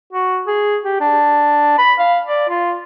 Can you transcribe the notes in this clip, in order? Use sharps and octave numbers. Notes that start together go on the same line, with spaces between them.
F#4
G#4
G4
D4
B5
F5
D5
F4